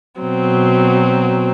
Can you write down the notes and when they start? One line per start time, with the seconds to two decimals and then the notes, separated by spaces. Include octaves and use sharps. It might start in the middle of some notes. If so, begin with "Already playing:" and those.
0.21 B2 F#3 C4